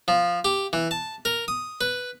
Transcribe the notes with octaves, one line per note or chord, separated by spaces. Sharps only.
F3
G4
E3
A5
A#4
D#6
B4